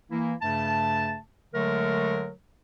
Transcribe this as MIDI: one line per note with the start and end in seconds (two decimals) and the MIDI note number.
0.11 0.35 52
0.11 0.35 58
0.11 0.35 64
0.42 1.18 43
0.42 1.18 49
0.42 1.18 57
0.42 1.18 81
1.54 2.31 50
1.54 2.31 54
1.54 2.31 56
1.54 2.31 57
1.54 2.31 70